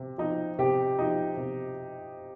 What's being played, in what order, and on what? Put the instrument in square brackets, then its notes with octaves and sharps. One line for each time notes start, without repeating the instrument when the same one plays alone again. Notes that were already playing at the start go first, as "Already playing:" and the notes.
Already playing: [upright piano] C3
F3 D#4
[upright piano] C3 [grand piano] G4
[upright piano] F3 D#4
C3